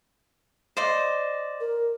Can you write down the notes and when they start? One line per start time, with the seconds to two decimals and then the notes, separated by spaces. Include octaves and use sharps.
0.77 C5 D5 D#5
1.60 A#4